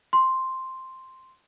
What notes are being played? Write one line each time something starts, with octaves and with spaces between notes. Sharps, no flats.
C6